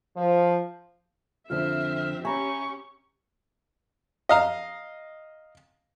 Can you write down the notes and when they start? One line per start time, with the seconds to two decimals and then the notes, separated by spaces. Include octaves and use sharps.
0.17 F3
1.50 F2 D3 F3 C4 F4 E5 F6
2.25 C#4 G4 E5 G#5 A#5 B5 C#6
4.29 D#5 F5 A#5